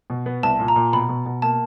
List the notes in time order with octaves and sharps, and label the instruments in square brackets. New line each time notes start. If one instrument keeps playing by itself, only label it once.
[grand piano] B2
B3
[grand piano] C2 [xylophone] A5
[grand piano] A#2
[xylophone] A#5
[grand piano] A#2
[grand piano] B2 [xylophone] B5
[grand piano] B2
B2
[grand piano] A#3 [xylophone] A5